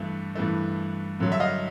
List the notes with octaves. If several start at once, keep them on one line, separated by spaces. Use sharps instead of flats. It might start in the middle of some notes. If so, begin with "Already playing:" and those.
Already playing: G2 E3 A3
G2 E3 A3
G2 D3 F#3
E5
D#5 F5